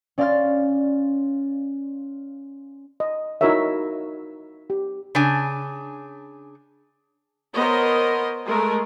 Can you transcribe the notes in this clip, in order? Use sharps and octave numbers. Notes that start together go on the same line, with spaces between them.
C#4 D5 F5 C6 F6 A6
D#5
D#4 E4 F#4 A#4 C#5 E5
G4
C#3 D4 G#5
B3 A#4 C5 C#5 D#5
G#3 A3 A#4